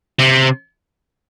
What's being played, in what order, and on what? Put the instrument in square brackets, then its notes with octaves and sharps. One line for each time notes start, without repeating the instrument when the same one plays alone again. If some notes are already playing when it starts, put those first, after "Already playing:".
[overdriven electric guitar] C3